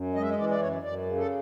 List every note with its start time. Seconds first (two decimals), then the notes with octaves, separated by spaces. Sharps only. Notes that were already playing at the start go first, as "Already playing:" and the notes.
Already playing: F#2
0.15 G#3 D#5
0.22 E5
0.30 D#5
0.37 E3 D5
0.49 D5
0.60 F#2 C#5
0.83 F#2 D5
1.06 C#3
1.17 A4